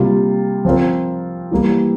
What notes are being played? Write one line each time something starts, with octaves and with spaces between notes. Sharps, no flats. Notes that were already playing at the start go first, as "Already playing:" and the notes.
Already playing: C3 G3 A#3 F4
F3 C4 F4 A#4
E3 G3 A#3